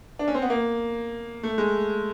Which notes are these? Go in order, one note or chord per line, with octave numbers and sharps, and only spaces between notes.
D4
C#4
C4
B3
A#3
A3
G#3